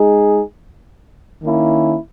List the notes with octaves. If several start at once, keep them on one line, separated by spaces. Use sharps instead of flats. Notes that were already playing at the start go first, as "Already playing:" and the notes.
Already playing: G#3 D#4 G#4
D#3 A#3 C#4 E4